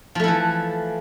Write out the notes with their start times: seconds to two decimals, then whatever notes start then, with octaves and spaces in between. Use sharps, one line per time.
0.15 F3
0.19 A3
0.24 E4
0.28 E3